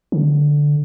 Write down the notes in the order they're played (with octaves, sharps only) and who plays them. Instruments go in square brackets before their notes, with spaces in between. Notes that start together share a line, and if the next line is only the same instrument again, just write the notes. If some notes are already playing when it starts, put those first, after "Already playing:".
[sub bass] D3